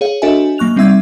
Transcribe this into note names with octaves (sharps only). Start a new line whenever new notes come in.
G#4 C#5 F5
D4 F#4 A4 D#5 E5 G#5
F#3 A#3 C#6 F#6 F7
G3 C4 D#4 E5 E6 G#6